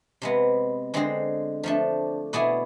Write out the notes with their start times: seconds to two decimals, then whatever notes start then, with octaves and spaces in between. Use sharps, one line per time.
0.22 C3 G#3 B3
0.94 D3 G#3 C4 G#4 C5
1.63 F3 A3 D4
2.33 B2 B3 E4 G#4 D5